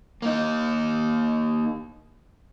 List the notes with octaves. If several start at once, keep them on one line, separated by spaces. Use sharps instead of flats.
A#3 D#4